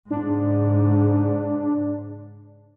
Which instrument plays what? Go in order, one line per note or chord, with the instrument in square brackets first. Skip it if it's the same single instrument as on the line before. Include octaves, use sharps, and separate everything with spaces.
[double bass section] G#2 C#3 [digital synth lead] D4